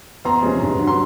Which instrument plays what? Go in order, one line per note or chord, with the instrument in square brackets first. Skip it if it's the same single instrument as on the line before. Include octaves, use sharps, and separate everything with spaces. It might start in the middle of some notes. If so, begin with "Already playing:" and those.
[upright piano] E2 A#5 C6
C3 F3 G#3 C#4
G2
D3 F#3
C6